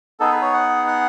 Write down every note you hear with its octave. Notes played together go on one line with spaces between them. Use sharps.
B3 D#4 G#4 A4
B4
C#5
F#5
F#5